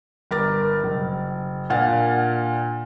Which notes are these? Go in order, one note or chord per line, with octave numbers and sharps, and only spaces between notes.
G1 A#4 D6 A6
F#1
A#2 D4 F5 F#5 A6